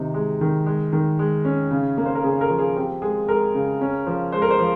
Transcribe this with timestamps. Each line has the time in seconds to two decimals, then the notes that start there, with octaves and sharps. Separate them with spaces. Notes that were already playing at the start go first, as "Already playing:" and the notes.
Already playing: C3 D#3 D#4
0.14 G#3
0.41 D#3
0.66 G#3
0.93 D#3
1.19 G#3
1.45 C#4
1.71 C#3
1.97 A#3
2.05 C5
2.15 A#4
2.24 C#3 G#4
2.41 A#4
2.50 F3
2.58 G#4
2.76 C4 G4
3.02 G#3 G#4
3.28 G#3 A#4
3.55 C#3
3.81 C#4
4.06 F3
4.32 G#3 C5
4.42 A#4
4.51 C5
4.59 F3